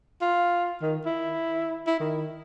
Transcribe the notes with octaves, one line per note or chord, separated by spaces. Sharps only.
F4
D#3
E4
E4
D#3